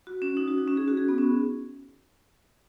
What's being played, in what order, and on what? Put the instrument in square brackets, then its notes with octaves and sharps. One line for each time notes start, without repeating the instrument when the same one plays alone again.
[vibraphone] F#4
C#4
D#4
F#4
D#4
C#4
G#4
F#4
G#4
B3
C#4